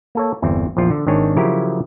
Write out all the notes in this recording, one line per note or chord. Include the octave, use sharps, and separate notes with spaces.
A#3 A4 C#5
G1 E2 C4
A#1 E2 F3 F4
D3
G#1 D#3 C4 D4 C#5 G#5
C#3 F3 F#3 E4 G4 A#4